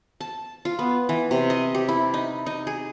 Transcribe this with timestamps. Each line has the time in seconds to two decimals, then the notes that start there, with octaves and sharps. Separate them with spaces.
0.21 A5
0.65 F4
0.79 B3
1.09 E3
1.31 C3
1.50 D#5
1.74 G4
1.89 E4
2.14 D#4
2.46 D#4
2.67 G#4